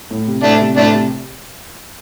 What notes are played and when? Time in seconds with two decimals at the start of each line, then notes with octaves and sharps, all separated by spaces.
0.11 A2
0.27 C3
0.43 A2 A3 D4
0.61 C3
0.77 A2 A3 D4
0.93 C3